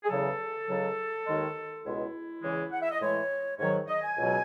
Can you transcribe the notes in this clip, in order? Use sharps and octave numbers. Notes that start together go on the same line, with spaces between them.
G#4
E2 C#3 F#3 A4
C#2 C#3 F#3
D#2 D#3 G#3
C#2 B2 G#3 E4
E2 C#3 E3 G#3
F#5
E5
D#5
A2 E3 G#3 C#5
G#2 D#3 F#3 C#5
D#5
G#5
C#2 B2 F#3